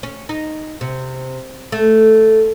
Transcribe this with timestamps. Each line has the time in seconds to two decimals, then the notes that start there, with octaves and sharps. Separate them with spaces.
0.03 C#4
0.29 D#4
0.81 C3
1.72 A3